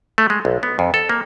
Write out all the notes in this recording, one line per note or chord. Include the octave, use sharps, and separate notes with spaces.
A3
G#3
B1
B3
F2
A4
A#3